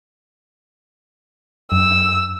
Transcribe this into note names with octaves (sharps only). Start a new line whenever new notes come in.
F#2 E6